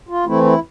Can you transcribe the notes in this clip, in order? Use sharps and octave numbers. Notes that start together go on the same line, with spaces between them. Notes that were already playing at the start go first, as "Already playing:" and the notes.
F4
E3 A3 C4 E4
E4